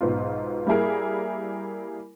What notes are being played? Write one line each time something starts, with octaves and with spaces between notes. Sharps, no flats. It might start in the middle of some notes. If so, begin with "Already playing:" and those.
B1 G#2 B3 F4
G3 A#3 E4 G#4 A#4